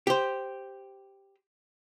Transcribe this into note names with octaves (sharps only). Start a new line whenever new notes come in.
G4 C5